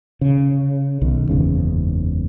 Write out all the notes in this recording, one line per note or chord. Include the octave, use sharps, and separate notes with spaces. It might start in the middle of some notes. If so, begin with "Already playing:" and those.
C#3
B1 D#3
F#1 E2 G#2 C#3